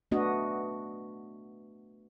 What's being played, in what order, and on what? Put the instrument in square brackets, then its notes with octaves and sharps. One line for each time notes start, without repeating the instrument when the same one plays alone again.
[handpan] A3 B3 D4 F#4 D#5